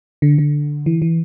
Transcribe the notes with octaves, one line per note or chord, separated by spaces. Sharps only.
D3
D3
E3
E3